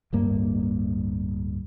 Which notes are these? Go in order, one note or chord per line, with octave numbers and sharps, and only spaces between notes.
D1 G2 A#3